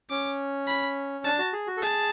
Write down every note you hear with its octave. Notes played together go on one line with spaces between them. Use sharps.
C#4 D6
B5
D4 A5
F#4
G#4
F#4
A4
G#4 A5